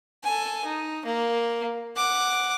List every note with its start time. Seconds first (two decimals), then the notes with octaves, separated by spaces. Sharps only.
0.24 A4 G#5
0.65 D#4
1.06 A#3
1.97 F#5 D6